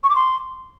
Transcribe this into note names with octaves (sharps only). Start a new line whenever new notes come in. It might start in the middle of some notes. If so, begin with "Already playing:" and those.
C#6
D6
C6